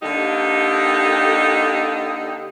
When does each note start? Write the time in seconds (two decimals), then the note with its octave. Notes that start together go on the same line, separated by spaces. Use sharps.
0.02 D3 A#3 D#4 G4 A4